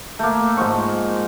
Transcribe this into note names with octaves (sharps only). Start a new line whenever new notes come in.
A3 A#3
G#2 F3 C#6